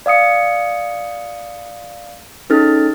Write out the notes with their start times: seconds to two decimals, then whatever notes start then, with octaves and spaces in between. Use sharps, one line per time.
0.06 D5 F5 D#6 C#7
2.50 C#4 D#4 G#4 A4 F6 A6